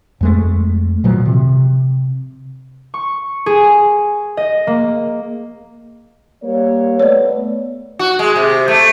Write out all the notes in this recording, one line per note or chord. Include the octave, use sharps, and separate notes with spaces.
F2 G#3 A3
A#2 D#3 F3 F#3
C3
C#6
G#4
D#5
A#3
G3 A#3 C#5
A3 B3 C#5 D5
F#4
G#3
C3
A3